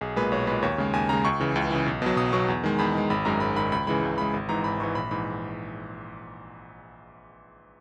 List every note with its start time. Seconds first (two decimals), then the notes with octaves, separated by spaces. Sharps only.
0.01 B1 G#4
0.16 A#2 G#3 B4
0.32 B1 C#5
0.47 A#2 G#3 B4
0.62 D#2 C#5
0.78 C#3 G#3
0.93 D#2 G#5
1.09 C#3 G#3 A#5
1.25 C#2 C#6
1.40 C#3 E3
1.56 C#2
1.70 C#3 E3
1.86 B1
2.02 B2 F#3
2.17 B1 D#6
2.33 B2 F#3 C#6
2.48 E2
2.64 D#3 G#3
2.79 E2 B5
2.95 D#3 G#3
3.10 G#1 B5
3.25 F#2 D#3 G#3 A#5
3.40 G#1 B5
3.56 F#2 D#3 G#3 B5
3.72 C#2 B5
3.87 C#3 E3 G#3 B5
4.03 C#2
4.18 C#3 E3 G#3 B5
4.34 G#1
4.49 G#2 E3 A#5
4.64 G#1 B5
4.80 G#2 E3 C#6
4.95 A#1 B5
5.11 G#2 E3 B5